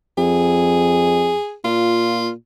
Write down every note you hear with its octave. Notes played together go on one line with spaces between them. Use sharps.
F2 G#4
A#2 F4